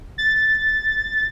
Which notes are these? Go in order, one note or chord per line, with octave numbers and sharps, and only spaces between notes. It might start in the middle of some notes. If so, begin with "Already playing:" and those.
A6